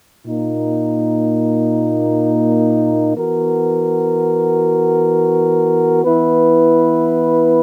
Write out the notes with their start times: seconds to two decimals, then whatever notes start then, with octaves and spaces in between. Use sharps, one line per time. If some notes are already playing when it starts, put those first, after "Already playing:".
0.24 A#2 A#3 D#4
3.14 E3 B3 F#4 A#4
6.03 E3 B3 E4 B4